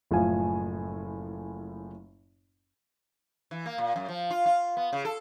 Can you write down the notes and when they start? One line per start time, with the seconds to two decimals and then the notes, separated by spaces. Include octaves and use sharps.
0.11 F#1 A2 F3 F5 G#5
3.51 E3
3.66 A#3
3.78 A#2
3.96 F#2
4.08 F3
4.30 F4
4.46 F4
4.77 B3
4.93 C#3
5.05 A4